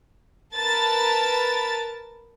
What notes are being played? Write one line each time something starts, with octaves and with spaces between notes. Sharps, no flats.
A#4 B4 A5 A6